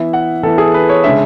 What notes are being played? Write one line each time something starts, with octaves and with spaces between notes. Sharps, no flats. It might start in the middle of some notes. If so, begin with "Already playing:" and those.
Already playing: E3 B3 E4 E5
F#5
E3 B3 E4 A4
G#4
B4
C#5
C#3 G#3 D4 E5